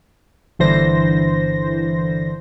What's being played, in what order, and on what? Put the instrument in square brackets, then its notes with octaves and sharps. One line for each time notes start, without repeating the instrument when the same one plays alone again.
[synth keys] G1 D3 E3 C5 A#6